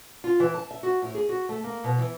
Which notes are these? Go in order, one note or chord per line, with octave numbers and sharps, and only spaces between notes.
F4
E3
A5
E5
F#4
A2
G#4
F#4
A3
A#3
B2
E3